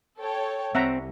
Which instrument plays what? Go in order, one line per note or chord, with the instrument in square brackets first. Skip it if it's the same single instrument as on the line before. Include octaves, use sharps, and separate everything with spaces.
[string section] A4 C#5 G5
[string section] C2 [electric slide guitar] C4 [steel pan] E5 F#5 A#5